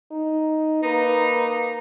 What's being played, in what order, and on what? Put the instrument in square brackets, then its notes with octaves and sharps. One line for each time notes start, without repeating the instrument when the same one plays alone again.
[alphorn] D#4
[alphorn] A#3 [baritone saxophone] D#4 [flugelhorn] B4